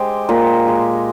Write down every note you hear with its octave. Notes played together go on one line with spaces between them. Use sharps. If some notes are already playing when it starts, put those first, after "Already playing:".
Already playing: G#3 G4 C5
A#2
G#3